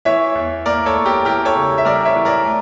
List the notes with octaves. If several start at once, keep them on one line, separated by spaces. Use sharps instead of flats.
E3 C#5 E5
E2
A#3 A#4 D5
A4 C#5
E2
G4 A#4
E3 G4 A#4
A4 C#5
C#3
E5
G3 A#4 D5
C#5 E5
E3
A#4 D5
A3